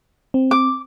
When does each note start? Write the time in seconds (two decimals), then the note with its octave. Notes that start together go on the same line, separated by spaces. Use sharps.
0.34 C4
0.51 D6